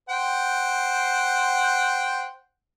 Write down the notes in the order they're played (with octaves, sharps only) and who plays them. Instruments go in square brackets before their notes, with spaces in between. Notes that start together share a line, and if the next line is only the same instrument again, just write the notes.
[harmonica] C5 F#5 G5